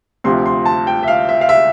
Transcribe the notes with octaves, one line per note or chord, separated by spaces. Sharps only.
D2 C3 F3 C6
C6
A5
G5
E5
F5
E5
F5
E5